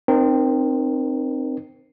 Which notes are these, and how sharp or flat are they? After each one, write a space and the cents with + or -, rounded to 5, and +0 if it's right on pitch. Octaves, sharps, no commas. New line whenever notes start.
C4 +0 D#4 -35 A#4 +20